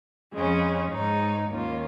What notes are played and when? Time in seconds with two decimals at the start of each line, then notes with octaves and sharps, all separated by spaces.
0.33 F2 C#3 G#3 C#4
0.91 G#2 G#3 D#4 C#5
1.49 D#2 D#3 A#3 C#4 F4